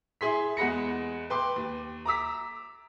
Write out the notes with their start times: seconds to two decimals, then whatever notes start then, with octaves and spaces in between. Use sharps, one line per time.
0.21 E4 G#4 C6 B6
0.57 E2 G#3 F#5 B5 A#6 C#7
1.30 B4 G5 C6 D6
1.56 D#2
2.05 A#5 D6 E6 B6